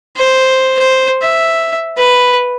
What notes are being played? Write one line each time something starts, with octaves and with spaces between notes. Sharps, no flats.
C5
C5
E5
B4